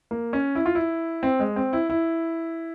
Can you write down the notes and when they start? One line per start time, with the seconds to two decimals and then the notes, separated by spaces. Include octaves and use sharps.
0.11 A#3
0.33 C#4
0.55 E4
0.66 F4
0.75 E4
1.23 C4
1.40 G#3
1.56 C4
1.73 E4
1.90 E4